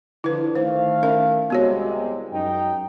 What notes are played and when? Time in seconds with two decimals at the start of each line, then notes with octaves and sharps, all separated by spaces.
0.24 D3 F3 D4 E4 B4
0.55 D#3 A3 C5 F5
1.03 C#4 A#4 E5
1.50 C2 C3 G#3 B3 F#4 C#5
2.32 F#2 D#4 G5